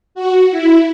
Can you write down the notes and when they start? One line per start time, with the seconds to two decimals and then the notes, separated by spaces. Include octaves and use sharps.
0.15 F#4
0.51 E4